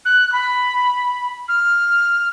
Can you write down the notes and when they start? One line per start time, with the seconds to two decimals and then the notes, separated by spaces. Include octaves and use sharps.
0.05 F#6
0.33 B5
1.48 F6